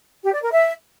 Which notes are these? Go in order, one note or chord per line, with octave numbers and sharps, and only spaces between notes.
G4
D5
A#4
E5